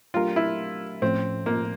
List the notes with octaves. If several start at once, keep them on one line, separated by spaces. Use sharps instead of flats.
F#3 A3 D4 F4 G4 A#4
E4
A2 F3 A3 C4 C#4
A#3